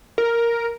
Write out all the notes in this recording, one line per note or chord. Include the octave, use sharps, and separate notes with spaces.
A#4